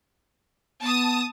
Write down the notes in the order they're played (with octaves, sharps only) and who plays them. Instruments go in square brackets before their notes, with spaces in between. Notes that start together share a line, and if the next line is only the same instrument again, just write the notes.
[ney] B3 [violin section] A5 D#6